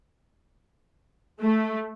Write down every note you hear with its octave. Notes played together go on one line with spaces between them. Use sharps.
A3